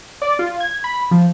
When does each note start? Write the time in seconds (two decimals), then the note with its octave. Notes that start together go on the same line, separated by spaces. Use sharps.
0.22 D5
0.39 F4
0.60 G#6
0.84 B5
1.11 F3